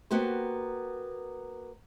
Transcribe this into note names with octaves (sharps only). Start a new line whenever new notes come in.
A#3 B3 F#4 G4 C5